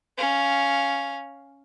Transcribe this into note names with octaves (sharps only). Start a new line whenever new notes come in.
C#4 F5